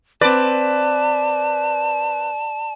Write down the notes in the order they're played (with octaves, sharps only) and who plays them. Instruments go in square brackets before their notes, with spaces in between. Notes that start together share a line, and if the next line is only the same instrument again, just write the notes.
[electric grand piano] C4 B4 [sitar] D5 [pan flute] A5